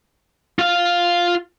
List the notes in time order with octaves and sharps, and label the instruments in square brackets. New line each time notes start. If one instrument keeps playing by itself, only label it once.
[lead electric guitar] F4 F5